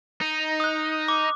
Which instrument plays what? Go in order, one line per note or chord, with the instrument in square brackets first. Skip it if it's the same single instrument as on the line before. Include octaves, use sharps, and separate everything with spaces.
[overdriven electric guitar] D#4
[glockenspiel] D#6 F#6
D6